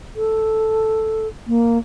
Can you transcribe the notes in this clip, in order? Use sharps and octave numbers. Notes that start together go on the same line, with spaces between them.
A4
A#3